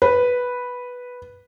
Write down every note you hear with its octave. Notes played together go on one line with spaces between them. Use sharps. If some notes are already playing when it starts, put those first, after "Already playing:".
B4